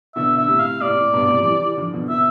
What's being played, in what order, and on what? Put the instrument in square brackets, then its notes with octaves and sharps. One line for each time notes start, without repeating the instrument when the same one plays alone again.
[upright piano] B2 D3 [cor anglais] E5
[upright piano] D3 [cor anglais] E5
[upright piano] A2 C3
[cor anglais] F5
[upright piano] A2 C3 [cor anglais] D5
[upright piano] A2
G2 B2
A2 C3
F3
E3 G3
E3 G3
D3 F3
B2 D3
[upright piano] B2 [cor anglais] E5